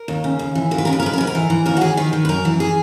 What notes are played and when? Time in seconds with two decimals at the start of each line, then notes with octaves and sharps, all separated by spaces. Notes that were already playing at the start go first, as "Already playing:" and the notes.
Already playing: A#4
0.08 D#2
0.24 C#3
0.39 D#2
0.55 E3
0.71 D#2 A#4
0.78 B4
0.85 C#3 A#4
0.93 B4
1.00 A#4
1.03 G#2 B4
1.13 A#4
1.18 G#2 B4
1.27 A#4
1.35 E3
1.50 E3
1.66 D#2 A#4
1.77 F#4
1.81 D#2 G#4
1.97 D#3 B4
2.13 D#3
2.25 B4
2.29 F#2 A#4
2.45 E3
2.60 G#4